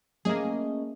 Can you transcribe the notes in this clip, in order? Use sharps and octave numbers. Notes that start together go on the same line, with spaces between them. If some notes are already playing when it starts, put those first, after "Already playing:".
A3 A#3 C#4 G#4 D#5